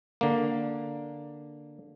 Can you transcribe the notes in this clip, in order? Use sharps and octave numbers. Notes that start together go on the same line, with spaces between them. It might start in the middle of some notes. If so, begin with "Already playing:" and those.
D3 A#3